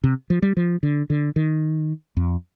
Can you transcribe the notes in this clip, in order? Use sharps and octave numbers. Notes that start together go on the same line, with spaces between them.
C3
F3
G3
F3
D3
D3
D#3
F2